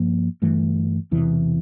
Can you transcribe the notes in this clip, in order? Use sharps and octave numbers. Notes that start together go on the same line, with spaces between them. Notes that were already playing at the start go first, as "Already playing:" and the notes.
Already playing: G2 F3 A#3
G1 G2 E3 A3
E1 E2 C3 E3